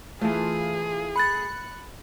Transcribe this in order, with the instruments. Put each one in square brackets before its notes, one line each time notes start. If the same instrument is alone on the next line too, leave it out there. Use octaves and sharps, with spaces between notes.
[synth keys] E3 F4 [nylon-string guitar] A3 A5 [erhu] G#4
[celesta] B5 A6 [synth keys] F#6 C#7